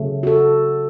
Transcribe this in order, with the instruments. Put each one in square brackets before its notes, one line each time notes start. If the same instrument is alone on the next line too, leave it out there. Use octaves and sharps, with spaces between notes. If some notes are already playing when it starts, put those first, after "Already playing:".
Already playing: [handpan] C#3 F#3 A3
F#4
A4